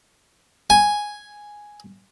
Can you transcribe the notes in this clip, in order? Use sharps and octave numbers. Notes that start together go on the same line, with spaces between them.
G#5